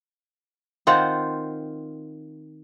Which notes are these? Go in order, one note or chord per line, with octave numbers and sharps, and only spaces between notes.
D#3 C4 F4 F#5